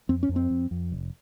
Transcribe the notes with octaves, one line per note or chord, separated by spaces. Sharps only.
F2 C4
C#4
F2
C4
F2
F2
F1